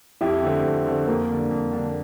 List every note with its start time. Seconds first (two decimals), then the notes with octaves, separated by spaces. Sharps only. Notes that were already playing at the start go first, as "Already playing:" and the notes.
0.21 F2 E4 G4
0.42 D3 A3 C4
0.64 F2
0.86 D3 A3 C4
1.07 F2 A#3
1.29 D3 G3 D4
1.50 F2
1.72 D3 G3 D4